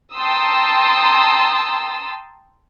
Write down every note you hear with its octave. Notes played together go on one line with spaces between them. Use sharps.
G5 A5 A#5 C6 D#6 E6